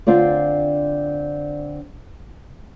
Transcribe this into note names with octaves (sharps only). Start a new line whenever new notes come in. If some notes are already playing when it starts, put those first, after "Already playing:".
D3 C4 D4 F4 D5